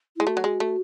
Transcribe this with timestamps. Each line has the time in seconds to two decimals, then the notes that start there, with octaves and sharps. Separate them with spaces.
0.16 G#3 E4
0.26 A3 F#4
0.37 F#3
0.44 G#3
0.60 A3